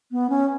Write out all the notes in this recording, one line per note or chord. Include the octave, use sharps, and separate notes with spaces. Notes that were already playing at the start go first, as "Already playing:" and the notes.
B3
C#4